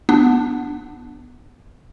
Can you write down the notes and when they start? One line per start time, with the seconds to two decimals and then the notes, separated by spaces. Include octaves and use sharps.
0.09 B3 D4